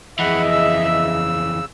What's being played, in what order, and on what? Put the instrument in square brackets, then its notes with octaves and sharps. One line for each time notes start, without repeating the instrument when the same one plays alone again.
[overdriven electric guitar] F2 E3 [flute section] G#4 D#5 [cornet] E5 [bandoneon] F#5 B5
[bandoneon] C#3 E6